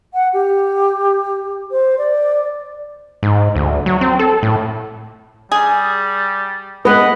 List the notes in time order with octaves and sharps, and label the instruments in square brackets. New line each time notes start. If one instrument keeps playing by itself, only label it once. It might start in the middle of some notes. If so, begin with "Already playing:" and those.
[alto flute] F#5
G4
C5
D5
[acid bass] G#2
D2
F#3
C4
A4
A2
[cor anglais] G3 [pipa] G#4
[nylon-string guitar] G#3 B3 [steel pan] B4 [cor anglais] D#5